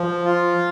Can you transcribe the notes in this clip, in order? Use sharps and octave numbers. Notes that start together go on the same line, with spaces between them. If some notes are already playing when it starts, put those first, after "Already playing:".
Already playing: F3
F4